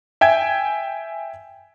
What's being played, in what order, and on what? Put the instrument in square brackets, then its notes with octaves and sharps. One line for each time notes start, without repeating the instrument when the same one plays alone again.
[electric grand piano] E5 G5 G#5 G#6